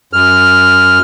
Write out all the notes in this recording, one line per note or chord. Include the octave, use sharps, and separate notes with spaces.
F#2 F6